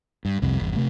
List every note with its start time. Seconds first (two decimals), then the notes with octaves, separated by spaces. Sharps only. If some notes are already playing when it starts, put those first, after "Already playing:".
0.25 G2
0.42 C2 F2 C3
0.60 G1 E2
0.76 C3 A3